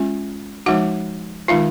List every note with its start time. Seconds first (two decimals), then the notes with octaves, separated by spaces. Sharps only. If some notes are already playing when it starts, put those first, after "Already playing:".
Already playing: G#3 C#4 F4
0.66 F3 G#3 D#4 F#4 F#5
1.48 D#3 G#3 D#4 F4 F5